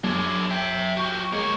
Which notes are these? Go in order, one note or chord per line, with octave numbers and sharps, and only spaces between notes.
F#2 D4 G#4
E5 G5
F#4 G4
G#3 A#3 C#5